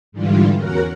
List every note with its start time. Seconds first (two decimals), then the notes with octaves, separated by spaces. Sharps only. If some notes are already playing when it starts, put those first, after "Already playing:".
0.12 G#2 D3 E3 G3 F4
0.56 E2 C#4 F#4 A#4 F#5